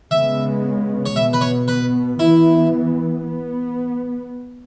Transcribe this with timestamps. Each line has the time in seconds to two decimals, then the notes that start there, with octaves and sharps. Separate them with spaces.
0.11 C#3 G#3 B3 E5
1.06 C#5
1.16 B2 B3 E5
1.33 B4
1.41 C#5
1.68 B4
2.19 E3 B3 E4
3.24 B3